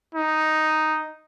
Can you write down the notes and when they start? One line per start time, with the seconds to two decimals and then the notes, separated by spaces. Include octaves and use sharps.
0.15 D#4